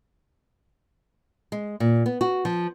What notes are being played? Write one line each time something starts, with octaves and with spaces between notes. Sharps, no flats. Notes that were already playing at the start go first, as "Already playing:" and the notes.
G#3
A#2
B3
F#4
F3